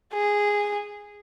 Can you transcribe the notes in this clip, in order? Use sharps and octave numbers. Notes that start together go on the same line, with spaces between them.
G#4